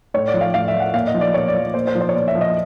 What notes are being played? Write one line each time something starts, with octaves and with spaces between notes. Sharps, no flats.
A2 C#5
D5
F3
F5
A2 F5
E5
F3
F#5
A#2 F5
D#5
F3
D5
A#2 C#5
D5
F3
A#2 C5
C5
F3
C5
C#5
A#2 D5
E5
F3
D#5